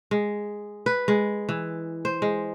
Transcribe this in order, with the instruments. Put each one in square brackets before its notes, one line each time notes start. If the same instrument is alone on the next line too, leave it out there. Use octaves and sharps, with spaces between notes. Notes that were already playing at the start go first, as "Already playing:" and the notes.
[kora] G#3
B4
G#3
E3
C5
G#3